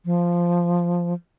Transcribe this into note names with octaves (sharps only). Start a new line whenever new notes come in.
F3